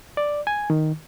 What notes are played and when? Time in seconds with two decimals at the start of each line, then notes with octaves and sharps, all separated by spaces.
0.17 D5
0.47 G#5
0.70 D#3